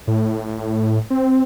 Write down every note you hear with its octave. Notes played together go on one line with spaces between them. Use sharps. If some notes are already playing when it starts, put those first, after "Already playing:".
A2
C4